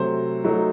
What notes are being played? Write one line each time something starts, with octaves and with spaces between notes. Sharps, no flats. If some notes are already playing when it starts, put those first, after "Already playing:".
Already playing: C3 F#3 A3 C5
F#3 A3 D#4